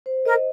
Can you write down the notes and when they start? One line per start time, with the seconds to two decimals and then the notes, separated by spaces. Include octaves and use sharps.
0.06 C5
0.26 A#4 D#5